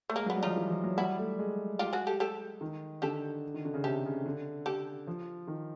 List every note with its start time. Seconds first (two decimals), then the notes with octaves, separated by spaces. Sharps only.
0.10 A3
0.16 G#3 A#3
0.26 F#3 B3
0.36 G3
0.43 F3 D#4 F4
0.56 E3
0.70 F3
0.84 F#3
0.97 G3 E4 F#4
1.18 A3
1.39 G#3
1.79 F4 G4
1.93 F#4 G#4
2.07 G4 A4
2.20 G4 A4
2.61 D#3
3.02 D3 G4 A4
3.54 D#3
3.65 D3
3.74 C#3
3.84 C3 G4 A4
4.05 C#3
4.26 D3
4.66 G4 A4
5.07 F3
5.48 D#3